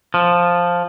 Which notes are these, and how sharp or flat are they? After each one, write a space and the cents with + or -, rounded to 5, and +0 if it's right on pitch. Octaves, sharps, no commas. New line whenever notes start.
F3 +5